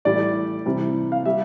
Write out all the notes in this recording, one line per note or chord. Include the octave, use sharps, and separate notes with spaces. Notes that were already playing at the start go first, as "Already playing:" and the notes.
A2 E3 G3 D5
C3 E3 G3
F5
G3 E5